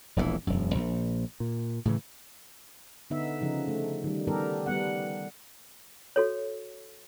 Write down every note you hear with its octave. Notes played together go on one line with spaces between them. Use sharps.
E1 A#1 A#2 E3
E1 F#2
A#1
A#2
A2 C#3 E3
D3 B3 D#4 E5
C#3 F3 D#4
A3
D#3 G3
D#3 G3 B3 G4 A4 A#4
G3 B3 F#5
F#4 A4 C#5